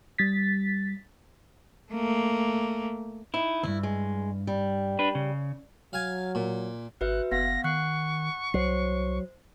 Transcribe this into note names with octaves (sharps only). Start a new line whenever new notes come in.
G3 A6 B6
A3 A#3
D#4 E4
D2 G2 E4
G#3
G3
D4 B4
C#3
F#3 F5 G#5
A#2
G#1 F#4 B4 E5 F#6
F#1 B3 F5 F#5 A#6
D#3 F#5 C#6 F#6 C7
C2 F#3 C5 C7